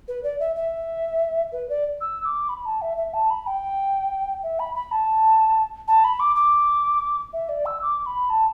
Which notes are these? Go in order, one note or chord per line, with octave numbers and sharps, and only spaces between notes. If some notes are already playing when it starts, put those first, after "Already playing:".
B4
D5
E5
E5
B4
D5
E6
D6
B5
A5
E5
E5
A5
B5
G5
E5
B5
B5
A5
A5
B5
D6
D6
E5
D5
E6
D6
B5
A5